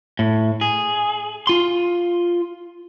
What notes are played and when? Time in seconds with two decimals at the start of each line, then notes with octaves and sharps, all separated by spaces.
0.19 A2
0.61 G#4
1.47 F4 C6